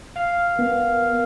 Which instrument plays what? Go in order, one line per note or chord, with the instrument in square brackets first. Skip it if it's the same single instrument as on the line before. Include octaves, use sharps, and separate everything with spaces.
[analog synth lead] F5
[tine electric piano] B3 [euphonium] A#4